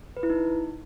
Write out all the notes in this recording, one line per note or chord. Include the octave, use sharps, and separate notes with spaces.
B4
E4
D#4